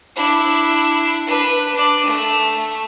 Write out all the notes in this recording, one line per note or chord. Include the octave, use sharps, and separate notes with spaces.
D4 E4
D4 B4
D4 D5
A3